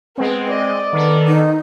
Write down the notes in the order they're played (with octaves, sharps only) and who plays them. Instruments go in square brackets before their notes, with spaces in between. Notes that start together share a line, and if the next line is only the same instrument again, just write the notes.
[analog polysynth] G#3 C4 [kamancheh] B3
[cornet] D5 [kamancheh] D#5
[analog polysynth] D#3 [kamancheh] B3 A4
[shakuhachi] D#4